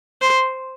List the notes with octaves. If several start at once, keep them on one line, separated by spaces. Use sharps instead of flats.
C5